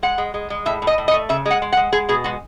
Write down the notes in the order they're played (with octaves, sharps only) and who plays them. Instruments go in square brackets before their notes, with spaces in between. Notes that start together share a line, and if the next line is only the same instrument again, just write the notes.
[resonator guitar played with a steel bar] G#3 F#5
G#3
G#3
G#3
A2 E5
A2
D#5
A2
D#5
A3
C#3 E5
G#3
F#5
G#3
F#5
G#3
G#3 G#4
B2 G#4
G#3 F#4